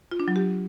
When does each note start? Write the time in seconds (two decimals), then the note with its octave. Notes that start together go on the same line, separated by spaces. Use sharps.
0.11 F4
0.20 D4
0.28 F#3
0.36 G4